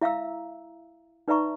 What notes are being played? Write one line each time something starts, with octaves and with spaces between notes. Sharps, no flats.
E4 E5 F5 A#5 E6
D#4 B4 D5 E5 A#5 C#6